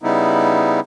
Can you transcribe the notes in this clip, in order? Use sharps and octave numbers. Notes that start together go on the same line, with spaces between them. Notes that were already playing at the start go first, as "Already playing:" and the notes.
C#3 G3 B3 D#4 E4